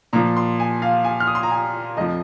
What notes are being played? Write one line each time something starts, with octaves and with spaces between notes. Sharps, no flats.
A#2 F3 A#5
C6
G#5
F5
G#5
F6
D#6
C6
A#5
G#5
F2 F3 D#5